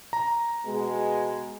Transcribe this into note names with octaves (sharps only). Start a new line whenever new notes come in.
A#5
B2 G#3